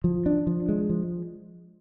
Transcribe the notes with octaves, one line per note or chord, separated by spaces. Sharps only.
F3
D4
F3
G#3
F3